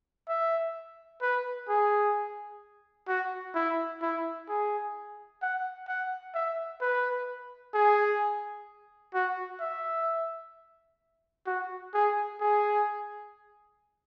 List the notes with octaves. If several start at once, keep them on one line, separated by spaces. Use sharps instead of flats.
E5
B4
G#4
F#4
E4
E4
G#4
F#5
F#5
E5
B4
G#4
F#4
E5
F#4
G#4
G#4